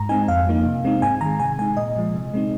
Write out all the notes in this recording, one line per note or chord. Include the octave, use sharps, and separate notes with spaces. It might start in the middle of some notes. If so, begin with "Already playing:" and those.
Already playing: G#2 A#5
G#3 C4 D#4 G#5
F2 F5
F3 A#3 D#4
C3
G#3 C4 D#4
G#2 G#5
D#3 G#3 A#5
C3 G#5
G#3 D#4 G#5
A#2 D#5
F3 G#3
C3
G#3 C4 D#4